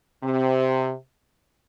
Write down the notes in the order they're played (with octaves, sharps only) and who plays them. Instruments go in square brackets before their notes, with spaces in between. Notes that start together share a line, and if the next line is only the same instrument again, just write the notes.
[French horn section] C3